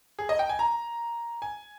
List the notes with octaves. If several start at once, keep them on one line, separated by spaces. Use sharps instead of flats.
G#4
D#5
G5
G#5
A#5
G#5